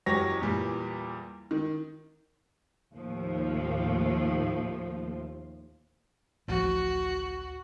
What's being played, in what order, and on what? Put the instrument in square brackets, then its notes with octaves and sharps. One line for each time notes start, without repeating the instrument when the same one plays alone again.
[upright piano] F#1 E2 F#3 G4 C#5 A#6
E2 A#2 E3 G3
D#3
[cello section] D#2 A2 F3
[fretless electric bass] A1 D2 F3 [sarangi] F#4